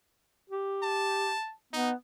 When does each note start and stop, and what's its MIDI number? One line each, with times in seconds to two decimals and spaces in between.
0.50 1.35 67
0.83 1.54 81
1.73 1.94 59
1.73 1.91 63